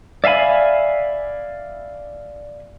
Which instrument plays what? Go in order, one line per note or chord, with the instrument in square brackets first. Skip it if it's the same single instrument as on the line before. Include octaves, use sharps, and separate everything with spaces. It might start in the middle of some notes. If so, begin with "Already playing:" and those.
[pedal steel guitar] D5 E5 F5 G#5 B5